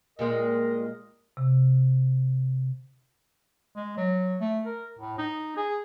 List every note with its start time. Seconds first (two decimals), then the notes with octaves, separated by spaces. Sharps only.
0.19 A#2 G3 G#3 A#4 D#5
1.37 C3
3.76 G#3
3.97 F#3
4.40 A3
4.65 A#4
4.99 A2
5.18 D#4
5.56 G#4